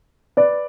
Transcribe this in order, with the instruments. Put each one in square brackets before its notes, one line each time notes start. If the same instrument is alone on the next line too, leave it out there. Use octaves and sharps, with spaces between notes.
[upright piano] B4 D5